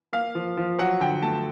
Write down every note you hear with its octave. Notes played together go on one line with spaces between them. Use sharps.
A#3 F5
F3
F3
F#3 F#5
D3 G5
A3 A5